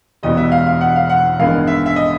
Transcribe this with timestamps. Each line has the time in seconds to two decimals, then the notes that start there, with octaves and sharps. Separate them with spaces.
0.23 E1 E2 B2 G3 B3 D#5
0.37 E5
0.52 F5
0.67 F5
0.81 F#5
0.96 F5
1.10 F#5
1.39 A1 G2 D#3 G#3 B3 F5
1.67 E5
1.86 E5
1.96 D#5